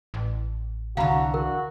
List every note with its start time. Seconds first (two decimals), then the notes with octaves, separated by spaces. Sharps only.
0.14 A1
0.97 C2 D3 E3 F#4 F5 A#5 B5
1.34 F#4 A#4